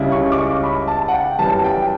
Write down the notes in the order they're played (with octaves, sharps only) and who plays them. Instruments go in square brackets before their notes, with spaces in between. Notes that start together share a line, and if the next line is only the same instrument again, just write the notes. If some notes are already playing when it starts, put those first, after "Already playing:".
Already playing: [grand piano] C#2 C#3 G3 C#4 E4
C#6
D6
C#6
B5
A5
F#5
G5
F#2 E3 G3 A5
G5